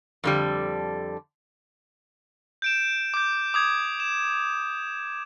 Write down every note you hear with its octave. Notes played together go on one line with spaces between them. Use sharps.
F2 D3 G3
G6 D7 E7
D6 G6
D6 D#6 G#6
E7